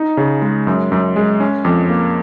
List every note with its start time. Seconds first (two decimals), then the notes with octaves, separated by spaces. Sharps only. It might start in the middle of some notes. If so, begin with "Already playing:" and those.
Already playing: D#4
0.17 C#3
0.42 G#3
0.67 F#2
0.92 F#2
1.16 G#3
1.40 C#4
1.65 F2
1.89 A#3